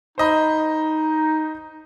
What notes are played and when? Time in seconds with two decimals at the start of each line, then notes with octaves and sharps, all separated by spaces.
0.18 D#4 C5 D#5 B5